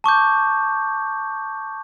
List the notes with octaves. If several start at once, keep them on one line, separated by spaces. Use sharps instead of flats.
A5 C#6 D6 G6